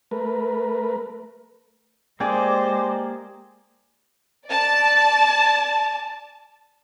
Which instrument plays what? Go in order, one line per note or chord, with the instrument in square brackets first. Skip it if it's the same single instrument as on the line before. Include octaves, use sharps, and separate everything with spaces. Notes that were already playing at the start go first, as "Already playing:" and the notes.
[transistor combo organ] A3 A#4 B4
[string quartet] G#3 C5 [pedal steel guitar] A#3 D5 [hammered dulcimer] G4 G#4 [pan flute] D6
[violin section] D5 A5